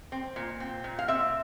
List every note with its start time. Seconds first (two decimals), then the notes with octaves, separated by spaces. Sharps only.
0.12 C4
0.36 A#2
0.60 C4
0.84 A#2
0.99 F5
1.08 C4 E5